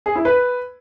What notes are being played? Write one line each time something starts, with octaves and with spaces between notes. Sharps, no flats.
G#4
E4
B4